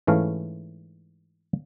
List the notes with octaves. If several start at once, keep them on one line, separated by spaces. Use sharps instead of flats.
G#2 E3 A3 C#4 F5